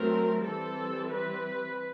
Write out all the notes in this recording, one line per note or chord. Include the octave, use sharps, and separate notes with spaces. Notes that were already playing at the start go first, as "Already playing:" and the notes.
Already playing: F#3 A3 C4 A#4
E3 G3 C4 A4
B4